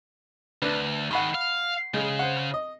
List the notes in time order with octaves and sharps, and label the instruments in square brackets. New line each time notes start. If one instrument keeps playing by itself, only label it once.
[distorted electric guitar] D2 [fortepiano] D4 B4
[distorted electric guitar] D#3 G#4 [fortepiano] F#5 B5 C#6
[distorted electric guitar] F5
[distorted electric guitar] C#3 [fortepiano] G#3
[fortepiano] C5 F#5
D#5